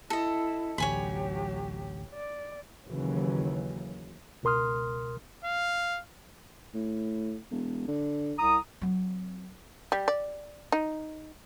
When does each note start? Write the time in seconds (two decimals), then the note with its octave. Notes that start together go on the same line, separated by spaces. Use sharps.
0.10 E4 A4 D#5
0.78 A1 D2 F#3 G4 C#5 G#5 B5
2.14 D5
2.87 D#2 C#3 E3 F#3
4.43 C#2 B2 A#4 C6 D#6 F6
5.45 F5
6.74 A2
7.51 E1
7.88 D3
8.37 C2 A#5 D#6
8.81 F#3 C4
9.92 G3
10.08 D5
10.72 D#4